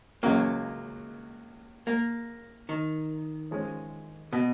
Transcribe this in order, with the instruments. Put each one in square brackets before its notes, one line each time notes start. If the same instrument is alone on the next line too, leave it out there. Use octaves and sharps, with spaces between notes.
[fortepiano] C#2 C#3 F#3 C#4 [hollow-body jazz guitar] A#3
[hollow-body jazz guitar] A#3
D#3
[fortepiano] F3 G#3 C#4
[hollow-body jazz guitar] B2